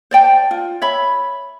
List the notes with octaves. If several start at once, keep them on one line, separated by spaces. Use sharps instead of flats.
C5 D5 G5 A5
F4
C#5 E5 B5